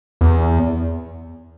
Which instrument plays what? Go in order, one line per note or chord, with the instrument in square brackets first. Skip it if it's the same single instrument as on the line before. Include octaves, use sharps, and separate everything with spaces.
[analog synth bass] E2